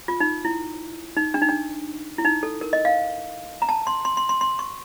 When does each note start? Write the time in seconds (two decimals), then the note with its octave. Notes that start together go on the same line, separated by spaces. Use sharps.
0.08 F4
0.20 D#4
0.45 E4
1.16 D#4
1.34 D4
1.42 D#4
1.49 D4
2.18 E4
2.25 D#4
2.43 A4
2.61 A#4
2.73 D#5
2.85 F5
3.62 A#5
3.69 A5
3.87 C6
4.05 C6
4.17 C6
4.29 C6
4.41 C6
4.59 C#6